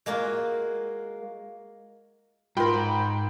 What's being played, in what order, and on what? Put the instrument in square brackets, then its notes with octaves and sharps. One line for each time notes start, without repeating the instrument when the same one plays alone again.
[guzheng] G#3 A#3 F4 F#4
[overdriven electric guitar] G#2 [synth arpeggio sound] F4 A#4 [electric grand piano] G5 B5 C6